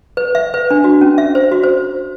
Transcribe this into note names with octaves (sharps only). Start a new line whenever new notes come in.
B4
E5
B4
D4
F#4
C#4
E5
C5
F#4
C5